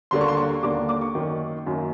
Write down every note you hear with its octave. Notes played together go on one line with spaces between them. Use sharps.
D#2 D3 G3 A#3 D4 C6
C#6
C6
C#6
D#2 D3 G3 A#3 D4 D6
D6
C#6
F#2 D#3 F#3 A#3
F#2 D#3 F#3 A#3